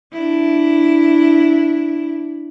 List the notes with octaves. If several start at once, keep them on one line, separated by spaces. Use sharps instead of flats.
D4 E4